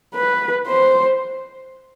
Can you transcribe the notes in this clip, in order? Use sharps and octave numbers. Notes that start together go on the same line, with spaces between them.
B4
C5